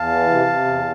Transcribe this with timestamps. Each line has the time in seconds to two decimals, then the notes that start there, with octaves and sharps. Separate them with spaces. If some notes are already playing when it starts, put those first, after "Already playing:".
Already playing: E2 F5 A5
0.10 E3
0.29 C3
0.47 C3
0.66 E2